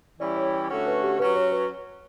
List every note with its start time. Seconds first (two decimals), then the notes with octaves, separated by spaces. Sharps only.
0.20 E3 G3 C#4 E4 G4 D5
0.37 C#5
0.54 C#5
0.70 D3 A3 C#4 F#4
0.87 B4
1.03 G4
1.19 F#3 C#4 F#4 B4
1.36 C#5
1.52 B4